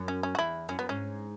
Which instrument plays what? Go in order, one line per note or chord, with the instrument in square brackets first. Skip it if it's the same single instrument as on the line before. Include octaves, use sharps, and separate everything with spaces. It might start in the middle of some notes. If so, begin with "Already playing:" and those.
Already playing: [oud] F#2
[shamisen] C#4
C#4
F#4
[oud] E2 [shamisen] E4
[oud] F#2 [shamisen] C#4
[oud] F#2 [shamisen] B3
[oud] G#2 [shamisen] C#4